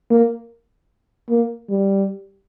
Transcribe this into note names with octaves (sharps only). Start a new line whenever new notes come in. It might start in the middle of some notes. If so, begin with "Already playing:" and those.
A#3
A#3
G3